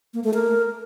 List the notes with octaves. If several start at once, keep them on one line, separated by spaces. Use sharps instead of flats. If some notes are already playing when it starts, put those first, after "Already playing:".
A#3
A3
A#4